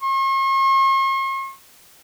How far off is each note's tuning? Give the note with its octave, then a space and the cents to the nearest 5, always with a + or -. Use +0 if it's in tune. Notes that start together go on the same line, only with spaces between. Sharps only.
C#6 -45